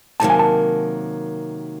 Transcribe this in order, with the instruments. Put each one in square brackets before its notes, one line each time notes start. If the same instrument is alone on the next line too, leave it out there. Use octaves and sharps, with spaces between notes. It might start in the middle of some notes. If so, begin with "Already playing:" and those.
[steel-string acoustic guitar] C3 D#3 F#3 A#3 [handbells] A5
[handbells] G#5
A5